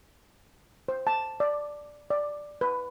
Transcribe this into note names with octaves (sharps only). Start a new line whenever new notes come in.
C5
A5
D5
D5
B4